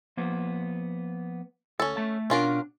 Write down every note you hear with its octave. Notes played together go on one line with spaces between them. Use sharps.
F3 A#3 B3
D2 C#4 A4
A3 A5
B2 C#4 D4 F4 A#4